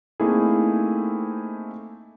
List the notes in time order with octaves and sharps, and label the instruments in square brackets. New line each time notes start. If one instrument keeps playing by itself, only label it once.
[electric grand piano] A3 A#3 C4 D#4 E4 G#4